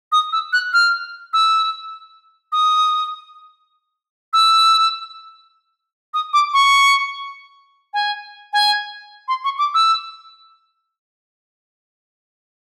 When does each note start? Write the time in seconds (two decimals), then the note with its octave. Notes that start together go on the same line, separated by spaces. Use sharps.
0.12 D#6
0.32 E6
0.53 F#6
0.73 F6
1.33 E6
2.52 D#6
4.33 E6
6.14 D#6
6.33 D6
6.53 C#6
7.94 G#5
8.53 G#5
9.28 C6
9.44 C#6
9.58 D6
9.74 E6